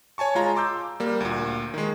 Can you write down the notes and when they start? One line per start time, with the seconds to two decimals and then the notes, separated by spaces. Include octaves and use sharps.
0.18 C#5 G#5 A5 C#6
0.35 G#3 F4 A#5
0.56 C6 D6 E6 G6
1.00 G3 A#3
1.21 D2 A#2
1.74 D#3 G#3